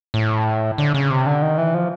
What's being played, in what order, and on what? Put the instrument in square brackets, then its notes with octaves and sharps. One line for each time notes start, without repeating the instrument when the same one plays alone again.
[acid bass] A2
D3
C#3
C3
D3
D#3
E3
F3